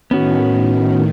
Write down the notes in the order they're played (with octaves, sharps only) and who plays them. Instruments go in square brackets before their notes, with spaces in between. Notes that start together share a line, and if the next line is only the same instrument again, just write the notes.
[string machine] A2 D#3 [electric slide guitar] B3 C#4 F#4